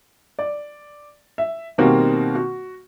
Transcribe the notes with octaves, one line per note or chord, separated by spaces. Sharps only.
D5
E5
B2 D#3 G3 A#3 C4 F#4
F#4